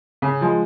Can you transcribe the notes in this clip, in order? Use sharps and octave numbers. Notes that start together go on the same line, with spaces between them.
C#3
F3 G#3